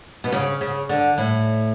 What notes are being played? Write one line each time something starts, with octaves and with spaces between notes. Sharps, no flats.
B2
C#3
C#3
D3
A2